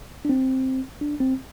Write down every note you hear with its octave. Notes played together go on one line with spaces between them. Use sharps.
D4
C4
D4
C4